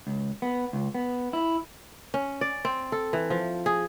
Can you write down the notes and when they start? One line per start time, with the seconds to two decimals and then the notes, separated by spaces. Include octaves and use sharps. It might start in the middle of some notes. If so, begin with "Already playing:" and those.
0.07 C#2
0.42 B3
0.73 C#2
0.95 B3
1.33 E4
2.14 C#4
2.41 D5
2.65 C4
2.92 A4
3.13 E3
3.30 F3
3.66 G#4